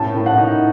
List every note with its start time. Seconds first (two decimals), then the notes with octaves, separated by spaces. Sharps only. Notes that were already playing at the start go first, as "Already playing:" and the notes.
Already playing: A2 C#4 A5
0.14 A2
0.26 F#5
0.37 D#4